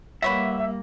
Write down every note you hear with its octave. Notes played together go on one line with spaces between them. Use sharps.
G3 A#3 B4 C#5 E5 F#5